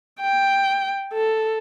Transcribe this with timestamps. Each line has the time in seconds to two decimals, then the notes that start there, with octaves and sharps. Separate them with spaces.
0.21 G5
1.13 A4